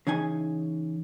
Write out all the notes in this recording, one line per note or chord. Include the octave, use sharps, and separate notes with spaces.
C#3 E3 D#4 G#5